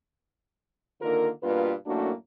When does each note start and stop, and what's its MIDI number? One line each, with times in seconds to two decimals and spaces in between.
1.01 1.29 50
1.01 1.29 51
1.01 1.29 58
1.01 1.29 65
1.01 1.29 70
1.43 1.73 43
1.43 1.73 47
1.43 1.73 58
1.43 1.73 65
1.43 1.73 71
1.86 2.11 42
1.86 2.11 45
1.86 2.11 57
1.86 2.11 58
1.86 2.11 62
1.86 2.11 66